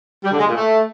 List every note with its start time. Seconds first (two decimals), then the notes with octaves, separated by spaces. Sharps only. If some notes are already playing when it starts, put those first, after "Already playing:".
0.24 G3
0.32 D3
0.39 G#3
0.47 A#2
0.55 A3